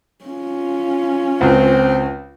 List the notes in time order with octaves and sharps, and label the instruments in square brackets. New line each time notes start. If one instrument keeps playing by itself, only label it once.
[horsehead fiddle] C#4 F4
[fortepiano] C#2 F#4 [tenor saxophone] C4